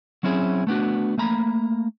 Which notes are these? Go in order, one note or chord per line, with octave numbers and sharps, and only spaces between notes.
F#3 C4 C#4 E4 G#4
A3 B3 D4 F#4
A3 A#3 A#5 B5